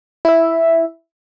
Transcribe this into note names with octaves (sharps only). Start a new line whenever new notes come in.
E4 E5